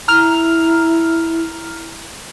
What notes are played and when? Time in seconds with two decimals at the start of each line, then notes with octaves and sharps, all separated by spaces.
0.08 E4 A#5 F6 F7